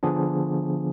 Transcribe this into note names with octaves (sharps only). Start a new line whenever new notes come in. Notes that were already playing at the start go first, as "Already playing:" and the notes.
D3 F3 B3 D4 G#4